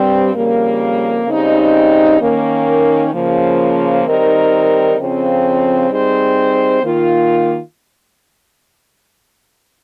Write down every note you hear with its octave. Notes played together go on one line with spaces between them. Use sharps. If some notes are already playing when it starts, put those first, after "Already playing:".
Already playing: G2 G3 C4
F2 C#3 G3 A#3
C#3 G3 C4 D#4
D#3 A#3 C#4
C#3 F3 A#3
D#3 G3 C4 D#4 A#4
F2 C#3 F3 C4
G3 C4 D#4 G#4 C5
D#3 A#3 F4